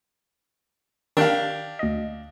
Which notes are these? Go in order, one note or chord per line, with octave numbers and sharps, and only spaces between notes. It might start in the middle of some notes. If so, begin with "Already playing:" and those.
D#3 D4 G4 F5 A5
D2 D#5